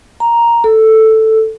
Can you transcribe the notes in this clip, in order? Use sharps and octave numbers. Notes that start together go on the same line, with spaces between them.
A#5
A4